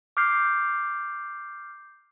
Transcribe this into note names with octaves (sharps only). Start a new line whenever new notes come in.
D6 F6 G6 C7